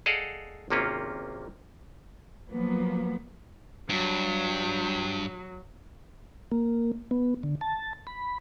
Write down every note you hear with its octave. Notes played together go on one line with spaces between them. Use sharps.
G#4 A4 D5 D#5 F5 F#5
G#1 C3 A#3 C4 C#4 F4
F3 F#3 A#3 B3
G2 F#3
A#3
B3
D3
A5
B5